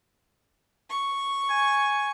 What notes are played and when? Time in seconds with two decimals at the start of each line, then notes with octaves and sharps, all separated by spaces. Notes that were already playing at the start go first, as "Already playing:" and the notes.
0.90 C#6
1.50 G#5